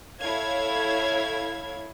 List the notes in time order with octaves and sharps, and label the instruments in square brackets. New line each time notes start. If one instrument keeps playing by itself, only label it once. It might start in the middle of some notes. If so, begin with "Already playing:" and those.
[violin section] E4 A4 C#5 F5 G#6